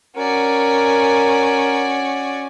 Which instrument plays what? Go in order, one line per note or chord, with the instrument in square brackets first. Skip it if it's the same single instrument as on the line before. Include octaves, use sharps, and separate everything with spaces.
[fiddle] C#4 [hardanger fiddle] F#4 D5 [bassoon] A#4